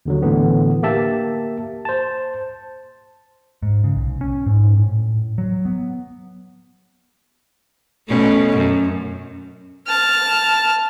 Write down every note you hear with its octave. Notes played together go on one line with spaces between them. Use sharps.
D#2 D3 F#3
A2 D3 E3 B3
A#3 G4 E5 A5
C5 A5
G#2
C#3
B1
C#4
G#2
A2
F#3
B3
B2 A3 C#4
F#2
A5 F6